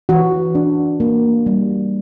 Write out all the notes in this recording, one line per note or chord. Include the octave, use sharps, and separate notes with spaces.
E3 F#4
D4
A#3
G3